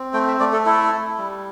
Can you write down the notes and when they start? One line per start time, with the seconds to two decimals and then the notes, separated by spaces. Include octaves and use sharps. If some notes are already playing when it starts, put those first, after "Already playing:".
Already playing: C4
0.13 A3 G5
0.28 E5
0.40 A3 D5
0.53 A4
0.66 E4 A4
0.92 E4
1.18 G3